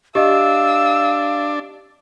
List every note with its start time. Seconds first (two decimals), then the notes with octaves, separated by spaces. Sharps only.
0.15 D4 G4 D#5 F5 E6